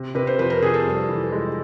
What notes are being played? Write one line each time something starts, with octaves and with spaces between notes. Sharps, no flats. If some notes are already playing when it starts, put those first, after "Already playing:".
Already playing: C3
C3 B4
C5
F2 B4
A#4
C3 G#4
A4
G2
E3
G#3